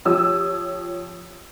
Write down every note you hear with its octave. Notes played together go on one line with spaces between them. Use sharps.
F3 G4 C#5 D#6 E6